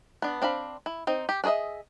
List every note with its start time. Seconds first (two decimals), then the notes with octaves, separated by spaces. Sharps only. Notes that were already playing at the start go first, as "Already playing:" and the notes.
0.22 B3 D4
0.42 C4 D4 F5 B5
0.86 E4
1.07 C4 D#4
1.29 G4
1.44 D4 G#4 C#5 D#5 E5